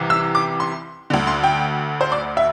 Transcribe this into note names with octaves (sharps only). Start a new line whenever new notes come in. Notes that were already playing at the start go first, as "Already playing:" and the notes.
Already playing: C2 C3 E3
E6
D6
C6
D2 D3
C6
G5
C5
D5
E5